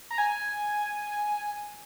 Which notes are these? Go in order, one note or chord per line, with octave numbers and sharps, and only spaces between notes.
A#5
G#5